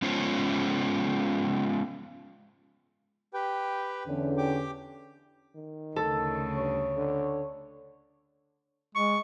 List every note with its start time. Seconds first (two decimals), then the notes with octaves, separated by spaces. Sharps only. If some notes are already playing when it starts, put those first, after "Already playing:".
0.02 G#3 B3 C#4 F4 C5 C#5
3.34 G4 B4 G5
4.07 E2 D3 C#4
4.38 G4 G5 D6
5.55 D#3
5.96 D2 C#3 A4
6.57 G2 C#5
6.97 D3
8.95 G#3 C#6